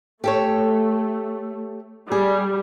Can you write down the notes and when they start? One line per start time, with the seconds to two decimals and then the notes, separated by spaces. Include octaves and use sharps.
0.24 A3 G4 A4 C#5
2.12 G3 G#4